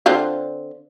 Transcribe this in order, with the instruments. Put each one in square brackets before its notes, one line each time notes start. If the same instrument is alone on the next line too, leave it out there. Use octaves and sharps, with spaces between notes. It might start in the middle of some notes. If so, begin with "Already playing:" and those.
[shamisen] D3 C4 F4